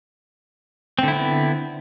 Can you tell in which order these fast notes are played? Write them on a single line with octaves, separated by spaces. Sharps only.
C4 D3 E4 B3